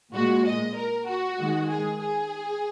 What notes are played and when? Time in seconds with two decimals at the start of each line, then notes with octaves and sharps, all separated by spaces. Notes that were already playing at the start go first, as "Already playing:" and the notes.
0.13 A#2 G#3 F#4
0.45 D#5
0.76 A#4
1.06 F#4
1.38 D#3 G#3
1.69 G#4
2.00 G#4